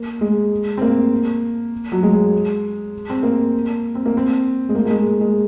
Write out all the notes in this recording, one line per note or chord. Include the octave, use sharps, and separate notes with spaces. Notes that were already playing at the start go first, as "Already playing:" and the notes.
Already playing: A#3
G#3
C4
A#3
F#3
G#3
C4
A#3
C4
A#3
C4
G#3
A#3
A#3
G#3
G#3